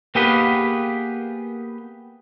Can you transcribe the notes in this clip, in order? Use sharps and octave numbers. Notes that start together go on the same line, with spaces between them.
A#3 B3 G4 G#4 B4